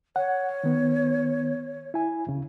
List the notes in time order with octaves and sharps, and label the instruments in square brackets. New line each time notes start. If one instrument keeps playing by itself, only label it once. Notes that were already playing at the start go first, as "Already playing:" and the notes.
[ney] C#5 [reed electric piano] F#5
[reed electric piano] D#3 B3
E4 G#5
D2 C#3